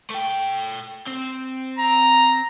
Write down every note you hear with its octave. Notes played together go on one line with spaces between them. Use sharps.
A3 G5
C4
A#5